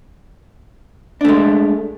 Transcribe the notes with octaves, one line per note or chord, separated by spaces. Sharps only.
G#3 A3 D4